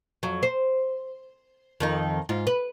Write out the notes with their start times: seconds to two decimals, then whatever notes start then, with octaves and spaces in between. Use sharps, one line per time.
0.23 F2 F#3
0.43 C5
1.80 F2 D#3 D#4
2.29 G#2 F4
2.47 B4